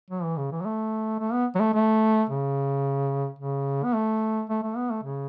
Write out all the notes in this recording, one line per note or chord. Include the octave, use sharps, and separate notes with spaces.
F#3
E3
C#3
E3
F#3
A3
A3
B3
F#3
A3
A3
C#3
C#3
B3
A3
A3
A3
B3
A3
C#3